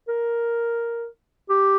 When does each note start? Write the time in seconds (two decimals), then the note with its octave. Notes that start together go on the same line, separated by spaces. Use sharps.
0.08 A#4
1.49 G4